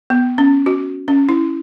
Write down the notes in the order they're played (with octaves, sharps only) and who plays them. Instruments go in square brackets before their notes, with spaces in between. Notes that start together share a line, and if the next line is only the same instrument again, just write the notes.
[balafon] B3
C#4
F#4
C#4
E4